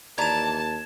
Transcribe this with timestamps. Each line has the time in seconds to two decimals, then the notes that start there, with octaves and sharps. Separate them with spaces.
0.18 D#2 E3 D4 A5 A#5 G#6 E7